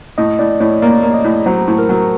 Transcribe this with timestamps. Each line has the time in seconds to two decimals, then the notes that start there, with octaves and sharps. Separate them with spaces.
0.18 A2 D#5
0.39 A2 D5
0.60 A2 C#5
0.82 A#3 D5
1.03 A#3
1.14 D#5
1.24 A2
1.46 F#3 C5
1.68 A2
1.79 A#4
1.89 F#3